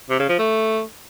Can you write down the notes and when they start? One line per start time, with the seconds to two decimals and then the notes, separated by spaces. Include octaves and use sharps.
0.10 C3
0.20 C#3
0.29 F3
0.39 A3